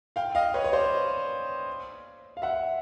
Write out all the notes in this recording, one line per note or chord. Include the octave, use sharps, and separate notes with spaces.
F5 G5
D#5 F5
B4 C#5
C#5
C5 D5
F5
E5 F#5